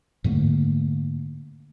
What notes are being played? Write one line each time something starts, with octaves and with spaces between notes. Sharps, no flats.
G#2 D3 A3 A#3